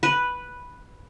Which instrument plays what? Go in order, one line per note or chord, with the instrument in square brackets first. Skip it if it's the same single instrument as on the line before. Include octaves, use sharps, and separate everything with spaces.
[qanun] B4